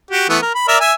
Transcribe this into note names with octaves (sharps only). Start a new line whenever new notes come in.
F#4 G4
E3 A3 B3
A#4
B5
A#4 D5 E5
E5 G#5